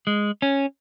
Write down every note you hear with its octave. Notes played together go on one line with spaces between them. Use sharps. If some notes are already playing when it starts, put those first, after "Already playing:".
G#3
C#4